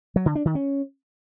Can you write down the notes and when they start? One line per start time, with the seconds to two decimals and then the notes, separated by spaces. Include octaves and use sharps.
0.16 F#3
0.26 D3
0.35 D4
0.45 D#3
0.55 C#4